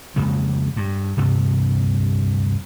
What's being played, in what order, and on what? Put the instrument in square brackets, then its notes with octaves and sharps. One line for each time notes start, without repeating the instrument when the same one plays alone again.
[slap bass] F2 C#3 G#3 A#3
G2
D2 G2 C3